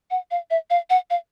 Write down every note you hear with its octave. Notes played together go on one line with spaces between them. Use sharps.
F#5
F5
E5
F5
F#5
F5